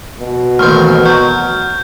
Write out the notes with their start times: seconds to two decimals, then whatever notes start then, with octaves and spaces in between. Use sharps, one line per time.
0.20 B2
0.59 A1 D#2 C4 F6
1.06 F#3 G6